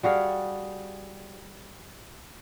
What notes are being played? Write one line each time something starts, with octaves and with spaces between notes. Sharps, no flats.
G3 F#4 G#4 F5